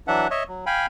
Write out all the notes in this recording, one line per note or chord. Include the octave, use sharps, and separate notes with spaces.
E3 F#3 D4 E5 F#5
C#5 D#5 E5
F#3
F5 G5 G#5 B5